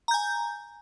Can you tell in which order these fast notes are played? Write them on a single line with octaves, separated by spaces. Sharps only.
A#5 G6 G#5